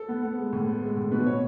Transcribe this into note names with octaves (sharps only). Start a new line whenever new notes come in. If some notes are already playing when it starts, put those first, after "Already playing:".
Already playing: A4
B3
B3
G#3
A2
B3
G#3
A2
B2 B4
B2 C#5